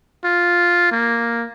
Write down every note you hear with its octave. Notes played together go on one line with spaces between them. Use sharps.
F4
A#3